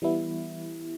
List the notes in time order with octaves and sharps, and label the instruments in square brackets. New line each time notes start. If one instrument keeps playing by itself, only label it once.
[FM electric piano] E3 G3 B3 E4